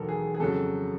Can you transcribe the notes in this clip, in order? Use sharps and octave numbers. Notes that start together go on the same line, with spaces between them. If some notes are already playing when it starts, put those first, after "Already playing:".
Already playing: E1 D#2 D#3 F#3 A4 A#4
G#4
G#4
F2 C#3 F#3 A4